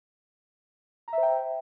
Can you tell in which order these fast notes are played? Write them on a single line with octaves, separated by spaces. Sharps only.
A#5 E5 C5 G5